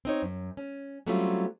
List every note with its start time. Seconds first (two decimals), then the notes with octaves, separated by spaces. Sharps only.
0.05 C4 D#4 C#5
0.23 F#2
0.57 C#4
1.07 F#3 G3 A3 C4 C#4 F4